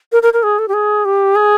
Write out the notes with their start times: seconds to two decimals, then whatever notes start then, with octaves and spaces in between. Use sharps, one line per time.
0.12 A#4
0.22 A#4
0.33 A#4
0.43 G#4
0.59 A4
0.68 G4
0.74 G#4
1.05 G4
1.36 G#4